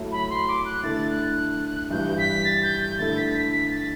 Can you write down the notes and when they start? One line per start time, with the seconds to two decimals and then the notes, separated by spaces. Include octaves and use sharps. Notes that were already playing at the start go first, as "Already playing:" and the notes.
Already playing: F#3 A3 E4
0.12 B5
0.30 C6
0.48 D6
0.65 F#6
0.83 D3 A3 E4 A6
1.10 F#6
1.91 G2 E3 G3 G6
2.18 B6
2.45 A6
2.63 G6
2.80 G6
2.98 D3 A3 E4 A4 A6
3.17 B6
3.34 B6
3.52 B6
3.71 A6